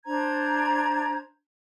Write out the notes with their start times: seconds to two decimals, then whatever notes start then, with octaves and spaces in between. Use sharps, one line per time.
0.05 D4 C5 A#5 G#6